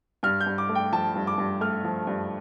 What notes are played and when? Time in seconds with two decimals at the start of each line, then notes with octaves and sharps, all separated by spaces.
0.23 G2 F6
0.41 G6
0.46 G2
0.58 D6
0.69 A3
0.75 G5
0.92 F3 A5
1.15 G2
1.27 D6
1.38 G2
1.61 A3 F6
1.84 F3
2.07 G2